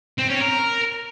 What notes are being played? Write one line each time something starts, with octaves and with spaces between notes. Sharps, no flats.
C4
C#4
A#4